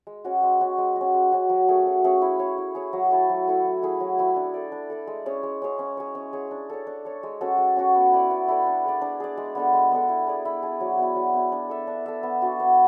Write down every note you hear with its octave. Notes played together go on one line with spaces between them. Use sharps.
G#3
C#4 F#4
G#3
C#4 F#4
G#3
C#4 F#4
G#3
C#4 F#4
F#3
A3 C#4 G#4
F#3
A3 C#4 G#4
E4
G#4 C#5
E4
G#4 C#5
F#3
A3 E4 A4
F#3
A3 E4 A4
F#3
A3 E4 G#4
F#3
A3 E4 G#4
D4
A4 D5
D4
A4 D5
G#3
C#4 G#4 C#5
G#3
C#4 G#4 C#5
C#4
G#4 C#5
C#4
G#4 C#5
D4
A4 C#5
D4
A4 C#5
G#3
C#4 F#4 A4
G#3
C#4 F#4 A4
B3
E4 A4 D5
B3
E4 A4 D5
D4
G#4 D5
D4
G#4 D5
G#3
B3 D4 A4
G#3
B3 D4 A4
E4
G#4 D5
E4
G#4 D5
F#3
B3 E4
F#3
B3 E4
D4
A4 E5
D4
A4 E5
B3
D4 F#4
B3